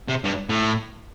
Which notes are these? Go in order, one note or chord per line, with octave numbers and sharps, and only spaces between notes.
C3
G2
A2